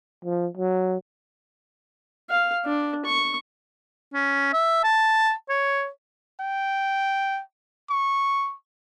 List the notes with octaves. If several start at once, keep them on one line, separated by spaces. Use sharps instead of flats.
F3
F#3
F5
D4
C#6
C#4
E5
A5
C#5
G5
C#6